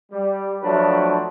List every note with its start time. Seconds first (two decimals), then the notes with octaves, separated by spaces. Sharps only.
0.12 G3
0.62 F3 F#3 A3 D4 B4